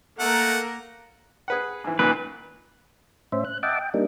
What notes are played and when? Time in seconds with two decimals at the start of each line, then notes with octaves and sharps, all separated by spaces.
0.19 A3 A#3 A#4 F#5
1.48 G#4 B4 F#5
1.84 G#2 E3
1.99 C#2 A#2 D#3 B4
3.32 A2 C#4 C5 E5
3.45 F#6
3.63 D#5 E5 F#5 G5 A5 D6
3.79 G5
3.94 G3 A#3 D4 D#4